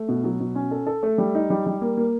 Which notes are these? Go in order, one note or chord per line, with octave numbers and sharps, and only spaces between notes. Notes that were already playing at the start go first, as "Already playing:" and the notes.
Already playing: A3
B2
F#3
B2
C#4
A4
A4
A3
G3
D#4
G3
G3
A#3
A#3